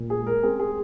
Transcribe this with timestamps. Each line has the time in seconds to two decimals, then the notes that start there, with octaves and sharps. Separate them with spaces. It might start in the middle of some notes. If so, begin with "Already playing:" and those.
Already playing: A#2
0.10 G#4
0.19 G#3
0.27 A#4
0.43 C4 G#4
0.60 G#4
0.68 G#3